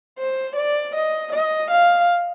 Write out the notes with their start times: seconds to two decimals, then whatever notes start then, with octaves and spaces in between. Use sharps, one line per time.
0.19 C5
0.56 D5
0.95 D#5
1.33 D#5
1.71 F5